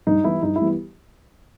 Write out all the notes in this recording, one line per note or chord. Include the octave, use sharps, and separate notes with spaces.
G2 D#4
E3 G3 B3 E4
G2 D#4
E4
E3 G3 B3